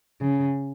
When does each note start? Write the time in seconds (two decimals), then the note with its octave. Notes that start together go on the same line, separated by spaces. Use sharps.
0.21 C#3